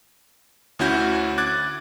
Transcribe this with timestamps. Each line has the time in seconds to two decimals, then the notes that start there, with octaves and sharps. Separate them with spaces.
0.79 D2 C#4 E4 F#4 G6
1.38 D6 F#6 G#6 A6